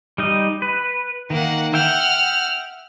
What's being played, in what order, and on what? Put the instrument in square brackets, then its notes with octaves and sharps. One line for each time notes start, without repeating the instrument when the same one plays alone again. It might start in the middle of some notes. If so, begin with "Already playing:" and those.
[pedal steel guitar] G3 D#4 D#5
B4
[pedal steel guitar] D#3 [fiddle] A#3 F#5
[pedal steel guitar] E5 G5 [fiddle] F#5 F6